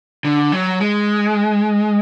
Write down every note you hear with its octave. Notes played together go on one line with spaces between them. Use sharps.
D3
F#3
G#3